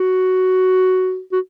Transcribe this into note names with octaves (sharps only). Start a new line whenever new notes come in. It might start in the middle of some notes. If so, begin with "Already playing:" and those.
Already playing: F#4
F#4